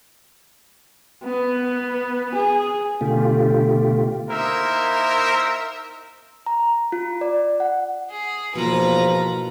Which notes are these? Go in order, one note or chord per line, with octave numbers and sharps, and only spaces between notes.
B3
G#4
B2 D3 A3 F4 G4
A#3 D#4 E4 A#4 C5 E5
A#5
F4
D5
F#5
G#4
E2 G#2 B2 F3 A#3 F4 B4 A#5